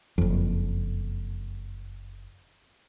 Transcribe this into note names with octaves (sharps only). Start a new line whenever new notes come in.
F#1 F2